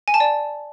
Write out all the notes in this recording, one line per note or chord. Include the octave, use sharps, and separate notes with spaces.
G#5
A5
D5